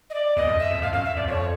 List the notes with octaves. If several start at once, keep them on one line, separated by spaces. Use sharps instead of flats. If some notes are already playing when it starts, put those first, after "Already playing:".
D#5
D5
E2 D#5
F2
E5
F2
F2 F5
F#2 F5
E5
F2 D5
F2 C#5